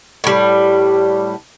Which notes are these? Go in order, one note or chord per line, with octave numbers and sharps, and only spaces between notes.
A2 G3